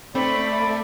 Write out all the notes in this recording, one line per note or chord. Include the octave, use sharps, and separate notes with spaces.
A3 C4 D5 B5